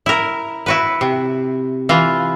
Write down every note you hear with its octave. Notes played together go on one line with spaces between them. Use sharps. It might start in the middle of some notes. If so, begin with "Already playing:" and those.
E4 A#4
E4 F#4 B4
C3
E3 F4